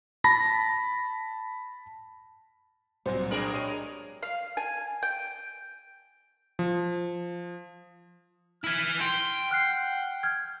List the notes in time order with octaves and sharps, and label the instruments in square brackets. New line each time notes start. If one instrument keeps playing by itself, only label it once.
[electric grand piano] A5 B5 A#6
[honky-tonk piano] C2 A#2 F#3 [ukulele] C5
[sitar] G2 G#4 A#4 [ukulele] D4
[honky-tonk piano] G#3 C#5 D#7
[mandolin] F5
G#5
G5
[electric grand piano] F3
[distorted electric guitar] E4 G#5 [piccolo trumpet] F6
[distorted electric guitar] G5 [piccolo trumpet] C6
[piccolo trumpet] F#5 [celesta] F6 F#6 C7
[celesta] F6 G#6 [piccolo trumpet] G6